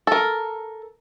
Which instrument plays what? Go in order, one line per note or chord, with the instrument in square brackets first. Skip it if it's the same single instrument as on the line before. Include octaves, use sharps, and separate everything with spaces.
[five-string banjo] A4 A#4